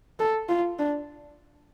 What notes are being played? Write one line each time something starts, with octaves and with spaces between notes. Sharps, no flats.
A4
F4
D4